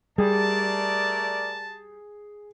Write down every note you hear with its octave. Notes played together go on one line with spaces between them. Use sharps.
G3 A3 G#4 A#4 D5 A5